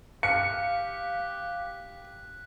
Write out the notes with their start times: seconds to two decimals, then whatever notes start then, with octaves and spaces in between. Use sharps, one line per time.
0.23 G4 F5 F#6 B6 C#7